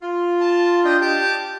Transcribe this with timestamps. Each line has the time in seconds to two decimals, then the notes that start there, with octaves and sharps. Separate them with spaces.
0.02 F4
0.41 A5
0.85 D4 D#5 G5
1.01 G4 A5 D6